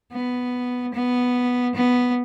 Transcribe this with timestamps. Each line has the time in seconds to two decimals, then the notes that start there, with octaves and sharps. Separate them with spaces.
0.12 B3
0.94 B3
1.75 B3